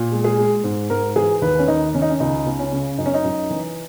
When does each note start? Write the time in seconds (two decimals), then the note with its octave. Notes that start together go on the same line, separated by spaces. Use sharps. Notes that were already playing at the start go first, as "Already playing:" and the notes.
Already playing: A#2
0.12 G#3
0.24 G#4
0.38 G#3
0.64 G#2
0.90 G#2 A#4
1.16 E3 G#4
1.42 D#2 B4
1.59 C#4
1.68 D#2 D#4
1.94 D#3 C#4
2.02 D#4
2.10 C#4
2.20 C#2 D#4
2.46 C#2
2.59 C#4
2.72 C#3
2.98 F#2 D#4
3.06 C#4
3.14 D#4
3.24 F#2
3.50 E3